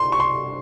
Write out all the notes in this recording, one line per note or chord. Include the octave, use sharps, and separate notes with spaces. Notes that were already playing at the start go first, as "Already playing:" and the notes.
Already playing: C6
C#6
C6